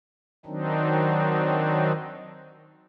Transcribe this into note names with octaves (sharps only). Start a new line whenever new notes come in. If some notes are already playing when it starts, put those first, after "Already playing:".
D#3 F#3 C4 D4 D#4